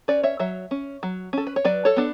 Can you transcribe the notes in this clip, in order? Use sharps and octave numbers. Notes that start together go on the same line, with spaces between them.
C#4 B4 D5
C#5 E5
F#3 C#5 E5
C#4
F#3
C#4 A4
B4
C#5
F#3 B4 D5
A4 C#5
B3 D4